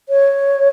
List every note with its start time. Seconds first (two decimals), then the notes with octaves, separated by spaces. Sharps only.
0.09 C#5